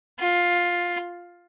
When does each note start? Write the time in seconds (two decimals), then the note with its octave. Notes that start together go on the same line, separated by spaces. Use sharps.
0.20 F4